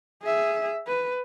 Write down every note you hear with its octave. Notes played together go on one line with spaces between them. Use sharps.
G#4 E5
B4